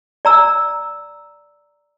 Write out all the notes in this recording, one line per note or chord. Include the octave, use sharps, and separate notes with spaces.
D5 A#5 E6